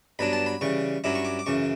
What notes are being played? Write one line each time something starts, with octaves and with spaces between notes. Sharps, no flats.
G2 F#3 B3 D4 B5
A5
B5
C#3 E3 G3 C#6
G2 F#3 C#4 E4 D6
C#6
D6
D6
F#2 C#3 E3 C#6